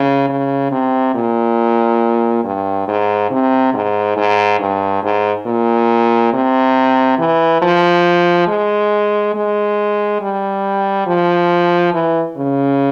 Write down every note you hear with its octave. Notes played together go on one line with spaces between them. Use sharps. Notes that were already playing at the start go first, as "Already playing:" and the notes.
Already playing: C#3
C#3
C3
A#2
G2
G#2
C3
G#2
G#2
G2
G#2
A#2
C3
E3
F3
G#3
G#3
G3
F3
E3
C#3